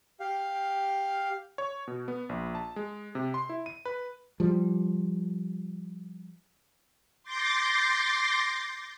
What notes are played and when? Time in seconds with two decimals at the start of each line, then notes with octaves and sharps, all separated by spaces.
0.20 G4 F5
1.58 C#5
1.87 B2
2.08 B3
2.29 A#1
2.55 A5
2.76 G#3
3.15 C3
3.34 C6
3.49 E4
3.66 D#7
3.85 B4
4.40 F3 G3
7.23 C6 D6 G6 A6 A#6 C7